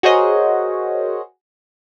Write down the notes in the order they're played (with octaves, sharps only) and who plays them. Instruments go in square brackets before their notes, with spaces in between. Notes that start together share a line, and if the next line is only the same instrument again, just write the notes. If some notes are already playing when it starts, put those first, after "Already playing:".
[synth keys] F#4 G#4 A#4 C5 C#5 D#5